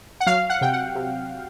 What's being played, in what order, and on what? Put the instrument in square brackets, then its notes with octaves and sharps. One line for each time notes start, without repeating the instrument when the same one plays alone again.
[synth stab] F#5
F#3 F5
F#5
C3 G5
F#5
C3